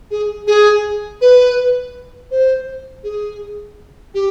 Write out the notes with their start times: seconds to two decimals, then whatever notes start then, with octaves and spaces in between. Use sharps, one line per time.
0.11 G#4
0.47 G#4
1.21 B4
2.31 C5
3.04 G#4
4.14 G4